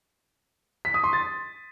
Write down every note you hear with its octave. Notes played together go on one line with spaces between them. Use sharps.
B6
D#6
C6
A6